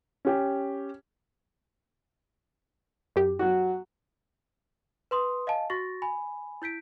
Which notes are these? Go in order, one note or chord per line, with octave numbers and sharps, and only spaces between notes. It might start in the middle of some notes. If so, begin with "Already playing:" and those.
C#4 G4
F#2 G4
F#3 F#4
B4 C6 D#6
D#5 F5 G#5 A5
F#4 C#6 A6 A#6
G#5 B5
E4 G6 B6 D7